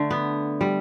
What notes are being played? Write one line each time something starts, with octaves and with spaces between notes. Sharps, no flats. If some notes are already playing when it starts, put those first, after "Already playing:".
Already playing: D3 A3
B3
G3